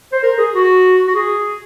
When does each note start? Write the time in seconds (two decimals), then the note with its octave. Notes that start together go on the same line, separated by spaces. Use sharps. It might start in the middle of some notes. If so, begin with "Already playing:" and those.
0.12 C5
0.23 A#4
0.38 G#4
0.55 F#4
1.07 F#4
1.15 G#4